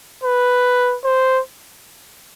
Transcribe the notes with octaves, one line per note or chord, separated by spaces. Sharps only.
B4
C5